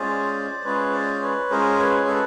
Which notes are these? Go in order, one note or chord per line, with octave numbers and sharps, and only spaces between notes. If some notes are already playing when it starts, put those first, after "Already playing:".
Already playing: G#3 C#4 F4 G#4 C5 D5
C5
G#3 C#4 F4 G#4 B4 C#5
C5 D5
B4 C#5
G#3 C#4 F4 G#4 A#4 C5
B4 C#5
A4 B4